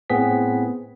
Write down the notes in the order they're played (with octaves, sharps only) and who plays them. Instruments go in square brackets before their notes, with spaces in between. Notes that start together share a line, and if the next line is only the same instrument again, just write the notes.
[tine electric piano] A2 B3 C4 G#4 B6